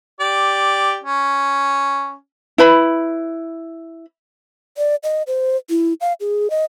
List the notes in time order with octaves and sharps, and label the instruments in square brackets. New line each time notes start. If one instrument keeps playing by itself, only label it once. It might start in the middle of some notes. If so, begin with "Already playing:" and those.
[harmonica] G4 D5
C#4
[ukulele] E4 B4 B5
[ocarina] D5
D#5
C5
E4
F5
G#4
D#5